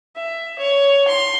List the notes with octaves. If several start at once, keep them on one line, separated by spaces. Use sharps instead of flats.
E5
C#5
C6